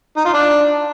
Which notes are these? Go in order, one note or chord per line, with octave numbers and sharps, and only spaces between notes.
D#4
F4
D4